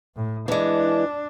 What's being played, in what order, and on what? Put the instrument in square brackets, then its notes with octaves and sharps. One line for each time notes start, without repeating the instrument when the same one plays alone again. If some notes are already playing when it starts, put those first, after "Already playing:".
[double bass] A2
[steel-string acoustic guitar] E3 G#3 [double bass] D4